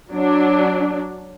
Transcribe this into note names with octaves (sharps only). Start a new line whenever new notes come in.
F#3 D4